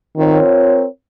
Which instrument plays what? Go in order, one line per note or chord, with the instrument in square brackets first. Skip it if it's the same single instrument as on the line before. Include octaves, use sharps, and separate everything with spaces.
[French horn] D#3 [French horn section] C4 F4 A#4 C#5